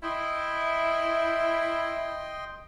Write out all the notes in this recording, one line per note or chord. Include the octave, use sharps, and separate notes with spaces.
E4 D#5 G5 C6